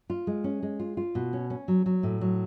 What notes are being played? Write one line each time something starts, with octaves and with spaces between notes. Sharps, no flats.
F4
G#3
C#4
G#3
F4
F4
B2
C#4
C#4
F#3
F#3
A2
F#3